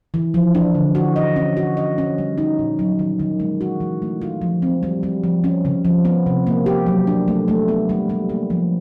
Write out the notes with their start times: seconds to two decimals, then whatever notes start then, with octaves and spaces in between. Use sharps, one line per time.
0.14 E3
0.34 F3
0.55 D4
0.75 D3
0.95 F#4
1.16 D#5
1.36 C#4
1.57 F#4
1.77 D#5
1.98 C#4
2.18 G3
2.38 D#4
2.59 A#2
2.79 F#3
2.99 D#3
3.20 D#3
3.40 G#3
3.61 F#4
3.80 E3
4.02 A3
4.22 F4
4.42 F3
4.62 C4
4.83 G3
5.03 G3
5.24 F3
5.44 C#4
5.65 C#3
5.85 F3
6.05 B3
6.26 C3
6.47 A#3
6.66 G4
6.86 F#3
7.07 D4
7.28 A3
7.48 A3
7.68 B3
7.89 G3
8.09 G3
8.30 A#3
8.50 F3